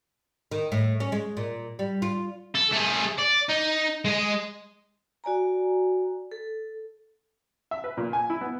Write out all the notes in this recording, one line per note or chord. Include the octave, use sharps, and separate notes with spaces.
D#3
A2
C#4
G#3
A#2
G3
F4
A4
A3 G#4
D5
D#4
G#3 D#5
F#4 D5 G#5 A#5
A4
E5
B4
A#2
G#5
E4
B3